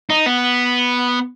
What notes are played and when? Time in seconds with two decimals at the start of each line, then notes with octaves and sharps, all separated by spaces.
0.10 D#4
0.26 B3